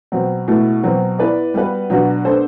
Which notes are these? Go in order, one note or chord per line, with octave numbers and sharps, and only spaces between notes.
B2 F#3 C4
B2 A3 E4
B2 F#3 C4
B3 E4 B4 D5
G3 B3 F#4 B4
B2 F#3 B3 D4 F#4
B3 D4 A4 C5